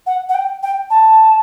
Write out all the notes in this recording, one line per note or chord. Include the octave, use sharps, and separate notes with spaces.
F#5
F#5
G5
G5
A5